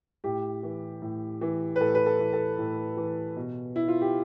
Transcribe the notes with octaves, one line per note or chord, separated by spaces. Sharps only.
A2 G4
E3
A2
E3
B4
A2 A4
B4
A4
E3
A4
A2
E3
B2
E4
F4
G4